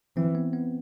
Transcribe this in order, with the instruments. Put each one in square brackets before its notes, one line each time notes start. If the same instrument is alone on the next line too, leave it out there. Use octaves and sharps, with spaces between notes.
[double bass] E3 [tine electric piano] C4
[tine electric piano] B3
B3